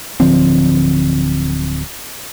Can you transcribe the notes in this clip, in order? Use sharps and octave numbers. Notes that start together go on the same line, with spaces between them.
D1 D3 F3 C4